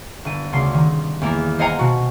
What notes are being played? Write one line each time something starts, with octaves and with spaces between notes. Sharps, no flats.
G1 D#7
D2 C#3 C6 C7
D#3
E2 A#3
C5 D#5 F5 F#5 G#5 A#5
B2 F#4